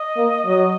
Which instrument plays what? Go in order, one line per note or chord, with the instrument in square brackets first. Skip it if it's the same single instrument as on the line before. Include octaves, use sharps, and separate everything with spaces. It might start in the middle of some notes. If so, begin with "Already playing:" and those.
Already playing: [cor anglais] D#5
[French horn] A#3
F#3